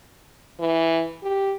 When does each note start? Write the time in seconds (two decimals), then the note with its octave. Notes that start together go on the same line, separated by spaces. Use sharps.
0.60 E3
1.23 G4